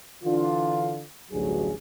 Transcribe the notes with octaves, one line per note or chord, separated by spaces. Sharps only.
D3 E3 D4 F4
A1 D2 G2 F#3 G#4